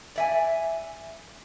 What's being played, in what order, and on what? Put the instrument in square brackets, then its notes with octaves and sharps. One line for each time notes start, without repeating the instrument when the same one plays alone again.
[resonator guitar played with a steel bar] D5 E5 G#5